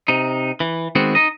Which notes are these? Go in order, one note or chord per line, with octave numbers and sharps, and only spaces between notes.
C3 D#4
E3
D#3 G#3 B3 C4 F#4
D#4 D#5